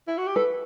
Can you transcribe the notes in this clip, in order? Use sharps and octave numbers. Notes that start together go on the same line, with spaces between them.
E4
F#4
G4
A4 B4